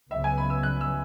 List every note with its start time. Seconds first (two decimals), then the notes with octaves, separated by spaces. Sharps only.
0.11 C#2 C#3 F#3 B3 E5
0.24 G#5
0.38 B5
0.50 E6
0.63 F#6
0.81 E6